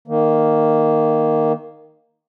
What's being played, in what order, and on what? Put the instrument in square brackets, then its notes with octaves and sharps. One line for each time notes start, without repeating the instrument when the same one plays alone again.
[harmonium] D#3 A#3